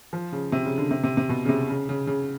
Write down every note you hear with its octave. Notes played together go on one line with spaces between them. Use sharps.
F3
C#3
C3
C#3
D3
C3
C3
C3
B2
C#3
C3
C#3
C#3
C#3